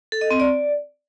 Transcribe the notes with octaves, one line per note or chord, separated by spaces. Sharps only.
A4
D#5
C4
D5